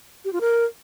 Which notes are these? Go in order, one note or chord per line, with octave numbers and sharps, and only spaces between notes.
G4
F4
A#4